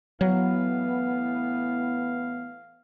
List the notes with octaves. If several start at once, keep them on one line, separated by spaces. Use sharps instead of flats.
A2 E3 F#3 B3 F5